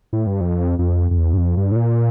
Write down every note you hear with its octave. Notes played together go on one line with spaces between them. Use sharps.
A2
G2
F2
F2
F2
E2
G2
F2
G2
A2
A#2